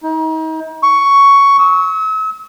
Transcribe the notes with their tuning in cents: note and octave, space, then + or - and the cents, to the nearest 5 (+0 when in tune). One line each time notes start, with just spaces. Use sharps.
D#4 +35
C#6 +10
E6 -40